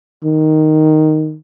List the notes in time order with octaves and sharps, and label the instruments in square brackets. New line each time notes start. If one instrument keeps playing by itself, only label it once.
[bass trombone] D#3